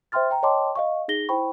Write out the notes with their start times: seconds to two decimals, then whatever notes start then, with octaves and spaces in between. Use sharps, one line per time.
0.12 C5 E5 G5 C6 F6 A6
0.31 G5 A#5
0.43 C#5 D#5 G5 A5 C6 D6
0.76 D#5 F5 C#6
1.08 D#4 G#4 A#6 G7
1.29 E4 C5 G5 B5 C#6